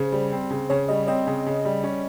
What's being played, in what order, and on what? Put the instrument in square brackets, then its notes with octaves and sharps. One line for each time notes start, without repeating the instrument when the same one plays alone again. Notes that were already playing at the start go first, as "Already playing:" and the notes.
Already playing: [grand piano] C#3 [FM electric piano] C5
[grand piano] G3
C4
C#3
[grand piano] C#3 [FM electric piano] C#5
[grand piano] G3 [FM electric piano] D#5
[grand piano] C4 [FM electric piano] D#5
[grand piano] C#3
C#3
G3
C#4